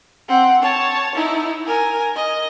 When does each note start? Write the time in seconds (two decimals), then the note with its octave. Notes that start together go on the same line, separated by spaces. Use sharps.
0.29 C4 F#5
0.62 C#5 A5
1.15 D#4 E4
1.66 A#4 G#5
2.16 D#5